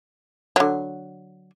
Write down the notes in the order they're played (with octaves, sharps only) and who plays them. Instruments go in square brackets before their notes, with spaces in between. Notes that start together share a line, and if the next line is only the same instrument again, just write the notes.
[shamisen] D3 F#3